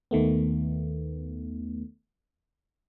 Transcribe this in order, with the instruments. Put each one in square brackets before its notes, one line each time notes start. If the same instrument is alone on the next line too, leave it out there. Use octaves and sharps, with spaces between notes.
[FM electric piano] D#2 D#3 A3 B3